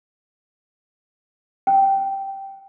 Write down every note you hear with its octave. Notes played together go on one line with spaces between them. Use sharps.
G5